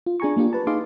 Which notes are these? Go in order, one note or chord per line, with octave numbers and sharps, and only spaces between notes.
F4
D4 G#4 G#5 A#5 C#6
A#3 D4 F4 G4
B4 A5
D#4 G#4 D#5 F5 C6 D6